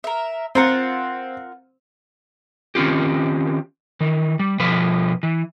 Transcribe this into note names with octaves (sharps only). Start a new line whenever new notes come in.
A#4 E5
C4 F4 A#4 F#5
D#3 C4 C#4 F4 G4
D#3 E3
G3
B2 F3 F4 B4
E3